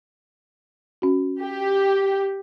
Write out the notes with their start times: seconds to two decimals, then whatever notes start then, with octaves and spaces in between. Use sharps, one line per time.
1.02 C#4 F#4
1.42 G4